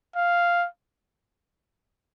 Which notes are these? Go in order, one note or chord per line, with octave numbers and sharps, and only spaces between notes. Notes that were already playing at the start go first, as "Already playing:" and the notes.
F5